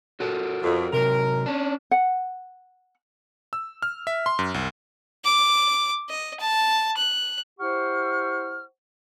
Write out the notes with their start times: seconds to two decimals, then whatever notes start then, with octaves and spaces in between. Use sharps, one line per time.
0.20 F#4 A4 A#4
0.62 F2
0.93 C3 F#3 A#4
1.46 C#4 D4
1.91 F#5
3.53 E6
3.82 F6
4.07 E5
4.26 C6
4.39 F#2
4.54 C2
5.24 D6
6.09 D#5
6.39 A5
6.97 F#6
7.60 E4 G4 C5 F#5 C#6 F6